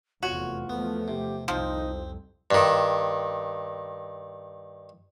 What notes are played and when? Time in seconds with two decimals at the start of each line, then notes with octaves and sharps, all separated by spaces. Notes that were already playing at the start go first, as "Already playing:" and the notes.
0.23 F1 E2 F4 F#4 C#5
0.70 E2 F3 A3 B3
1.08 C3 G4
1.48 C2 F2 F3 C4 D#4
2.51 G2 D#3